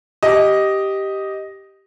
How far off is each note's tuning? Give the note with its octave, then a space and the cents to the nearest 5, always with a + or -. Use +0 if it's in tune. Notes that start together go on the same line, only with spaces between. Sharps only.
G4 -5 D#5 +0